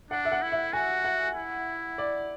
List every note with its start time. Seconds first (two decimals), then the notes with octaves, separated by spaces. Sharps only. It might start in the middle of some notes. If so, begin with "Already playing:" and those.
0.11 D4 F#5
0.25 E5
0.32 F#5
0.42 E4
0.52 E5
0.73 F#4 G#5
1.05 F#5
1.35 E4
1.98 D5